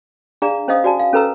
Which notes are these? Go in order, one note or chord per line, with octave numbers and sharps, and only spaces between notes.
D4 G#4 D5 F5 A#5
C#4 C5 D#5 F5 D#6
F#4 D5 G#5 A5
F5
C#4 A4 B4 A#5 E6